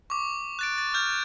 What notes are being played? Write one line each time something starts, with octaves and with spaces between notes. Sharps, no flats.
C#6 D6
F#6 A6 D7
A6
F6 G6